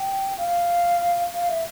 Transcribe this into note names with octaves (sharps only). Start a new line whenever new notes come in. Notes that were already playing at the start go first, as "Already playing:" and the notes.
Already playing: G5
F5
F5
E5